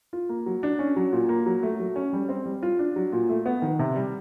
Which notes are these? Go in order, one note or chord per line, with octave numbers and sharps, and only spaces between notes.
F4
A#3
F#3
D4
C#4
F#3
A#2
A#3
F#3
A3
F#3
C#4
G3
C4
G3
F4
D4
F#3
A#2
A3
B3
D#3
C3
G3